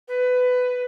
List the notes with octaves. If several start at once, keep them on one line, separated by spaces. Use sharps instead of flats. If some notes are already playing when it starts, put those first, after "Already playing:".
B4